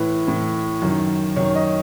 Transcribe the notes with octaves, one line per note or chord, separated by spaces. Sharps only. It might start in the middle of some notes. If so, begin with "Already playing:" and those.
Already playing: A2 E3 B4
A2 E3
F#2 D#3
F#2 D#3 C#5
D#5